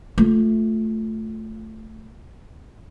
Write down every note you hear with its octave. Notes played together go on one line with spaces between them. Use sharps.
A3 F4